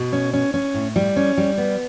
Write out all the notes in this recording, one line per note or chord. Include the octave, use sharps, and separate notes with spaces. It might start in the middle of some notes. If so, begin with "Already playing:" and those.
Already playing: B2
C#4
C#4
C#4
A2
G3
C#4
G3
B3